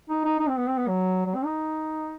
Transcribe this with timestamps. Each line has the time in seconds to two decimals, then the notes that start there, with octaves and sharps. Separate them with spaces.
0.10 D#4
0.24 D#4
0.39 D#4
0.48 C4
0.58 B3
0.68 C4
0.78 B3
0.87 F#3
1.26 F#3
1.35 C4
1.45 D#4